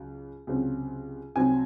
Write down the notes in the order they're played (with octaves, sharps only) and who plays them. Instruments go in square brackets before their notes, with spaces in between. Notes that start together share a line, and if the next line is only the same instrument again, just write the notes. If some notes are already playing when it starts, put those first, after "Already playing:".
Already playing: [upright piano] C#2 F#3
C#2 C3 F#3 C4
C2 C3 F#3 C4 G#5